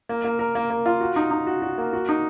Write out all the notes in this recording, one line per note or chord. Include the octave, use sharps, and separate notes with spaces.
A#3
A#3
A#4
A#3
A#3
F4
F#4
D#4
D#4
F#4
F#4
A#3
F#4
D#4